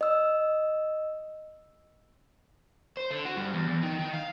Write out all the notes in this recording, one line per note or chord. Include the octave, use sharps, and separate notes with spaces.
D#5 E6
C5
D3
F#4
G2
E2
E2
D#3
D#3
F5